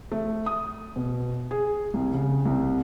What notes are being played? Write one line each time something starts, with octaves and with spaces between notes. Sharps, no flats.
A3
D#6
B2
G#4
C2
C#3
C2